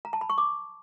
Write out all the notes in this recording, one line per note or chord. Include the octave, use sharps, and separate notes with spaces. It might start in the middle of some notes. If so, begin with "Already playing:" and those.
A#5
A5
B5
C#6
D6